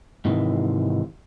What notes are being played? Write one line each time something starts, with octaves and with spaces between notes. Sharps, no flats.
G#2 C3 D#3 E3